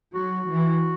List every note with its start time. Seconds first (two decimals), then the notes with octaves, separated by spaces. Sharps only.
0.15 F#3 F#4
0.48 E3